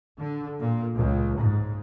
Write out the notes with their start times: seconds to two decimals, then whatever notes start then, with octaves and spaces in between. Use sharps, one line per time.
0.18 D3
0.59 A#2
0.95 C#2
1.39 G#2